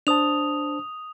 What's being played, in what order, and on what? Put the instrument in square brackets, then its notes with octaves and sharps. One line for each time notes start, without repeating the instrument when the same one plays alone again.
[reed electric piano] D4 C5 A5 [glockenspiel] D#6 F7